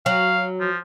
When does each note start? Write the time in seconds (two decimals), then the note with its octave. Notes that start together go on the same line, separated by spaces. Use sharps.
0.06 F#3 F5
0.60 F3